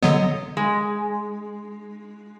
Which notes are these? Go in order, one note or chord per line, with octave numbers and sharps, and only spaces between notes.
D3 F#3 B3 D#5
G#3